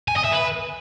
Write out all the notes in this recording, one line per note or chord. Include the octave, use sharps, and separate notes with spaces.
G#5
D#5
E5
B4